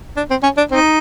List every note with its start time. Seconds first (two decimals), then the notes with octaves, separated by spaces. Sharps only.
0.17 D4
0.30 C4
0.43 C#4
0.57 D4
0.71 C4 D#4